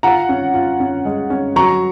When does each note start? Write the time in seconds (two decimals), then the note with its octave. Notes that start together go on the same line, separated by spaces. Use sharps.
0.03 F4 F#5 A#5
0.29 C#4
0.54 F4
0.80 C#4
1.05 G#3
1.30 C#4
1.56 F#3 A#5 C#6